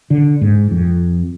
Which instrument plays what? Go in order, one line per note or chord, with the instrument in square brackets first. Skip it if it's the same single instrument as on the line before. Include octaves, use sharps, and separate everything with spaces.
[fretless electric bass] D3
G#2
F2